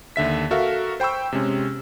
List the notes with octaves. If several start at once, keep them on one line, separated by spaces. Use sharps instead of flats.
D#2 D3 E5 B6
F#4 A4 A#4 E5 F5
C5 G5 B5 C#6 E6
C3 G#3 C#4